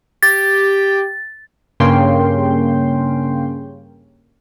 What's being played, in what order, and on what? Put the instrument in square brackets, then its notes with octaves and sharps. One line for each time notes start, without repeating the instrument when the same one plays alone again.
[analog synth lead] G4 [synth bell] A6
[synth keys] G2 C#3 A#3 C#4 G5 C6